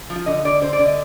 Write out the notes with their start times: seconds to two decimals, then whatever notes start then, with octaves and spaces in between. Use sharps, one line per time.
0.10 F3
0.16 F4
0.26 D3 D#5
0.45 D3 D5
0.62 D3 C5
0.73 D5
0.79 D3
0.86 D#5